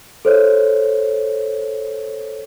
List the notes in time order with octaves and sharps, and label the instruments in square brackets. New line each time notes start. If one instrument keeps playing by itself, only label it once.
[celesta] A4 C5 C#5